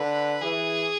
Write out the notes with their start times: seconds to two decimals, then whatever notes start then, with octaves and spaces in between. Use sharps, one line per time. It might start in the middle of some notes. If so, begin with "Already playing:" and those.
Already playing: D3 B4
0.42 E3 G#4